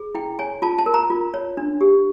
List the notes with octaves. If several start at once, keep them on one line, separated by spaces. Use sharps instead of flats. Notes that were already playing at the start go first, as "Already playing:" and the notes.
Already playing: G#4
E4 G5
C#5 G#5
F4 A5
A5
A#4
A#5
F4
C#5
D4
G4